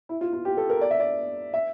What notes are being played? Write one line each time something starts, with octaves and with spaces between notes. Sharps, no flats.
E4
F4
F4
G4
A4
A#4
D5
E5
D5
E5